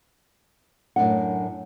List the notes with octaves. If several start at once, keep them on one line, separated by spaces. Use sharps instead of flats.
F#2 A2 G#3 D4 F#5